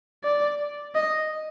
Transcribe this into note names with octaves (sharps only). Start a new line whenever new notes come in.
D5
D#5